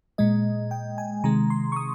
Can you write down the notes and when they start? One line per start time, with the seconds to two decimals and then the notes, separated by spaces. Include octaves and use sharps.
0.18 A#2 G#3 D#5
0.71 G5
0.98 G#5
1.24 C3 D#3 G#3 A#5
1.50 C6
1.72 C#6
1.76 D#6